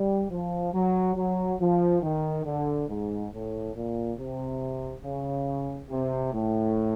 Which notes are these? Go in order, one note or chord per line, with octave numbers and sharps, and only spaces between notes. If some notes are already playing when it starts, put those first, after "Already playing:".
Already playing: G3
F3
F#3
F#3
F3
D#3
D3
G#2
A2
A#2
C3
C#3
C3
A2